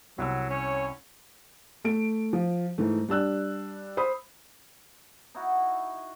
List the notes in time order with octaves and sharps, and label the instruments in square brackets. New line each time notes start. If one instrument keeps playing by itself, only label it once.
[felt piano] C2 F#5 E6 [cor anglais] F#3
[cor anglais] C#4 [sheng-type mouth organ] C#5
[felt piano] A3 D7
F3
G#2 E3 A3
G3 D4 E6 F#6
C5 B5 D#6
[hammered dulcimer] D#4 E4 F#4